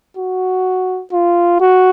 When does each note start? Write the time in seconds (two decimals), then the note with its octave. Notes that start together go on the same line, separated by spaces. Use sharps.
0.17 F#4
1.12 F4
1.60 F#4